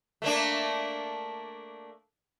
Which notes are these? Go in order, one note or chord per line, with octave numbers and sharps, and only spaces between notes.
A3 A#3 D4